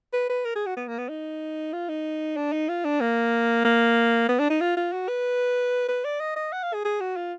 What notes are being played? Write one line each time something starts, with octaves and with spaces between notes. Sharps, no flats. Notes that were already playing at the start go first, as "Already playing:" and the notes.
B4
B4
A#4
G#4
F#4
B3
A#3
B3
D#4
F4
D#4
D4
D#4
F4
D4
A#3
A#3
B3
D4
D#4
F4
F4
F#4
B4
B4
D5
D#5
D#5
F#5
F5
G#4
G#4
F#4
F4